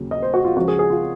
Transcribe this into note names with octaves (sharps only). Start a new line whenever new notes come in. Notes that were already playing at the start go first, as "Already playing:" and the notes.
Already playing: D#2 C#3 F#3
D#5
C5
F#4
F4
C#2 C#3 F3 F#4
G#4
G#4
F4